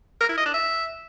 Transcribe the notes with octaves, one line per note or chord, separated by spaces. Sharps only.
A#4
E4
D#5
D4
E5